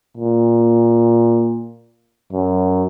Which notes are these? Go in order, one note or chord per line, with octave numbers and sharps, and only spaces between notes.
A#2
F#2